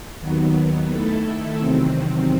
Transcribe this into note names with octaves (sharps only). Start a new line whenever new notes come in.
D#2 D#3 F#3 B3
D#3 A3 E4 A4
E2 C3 D#3 F#3 C4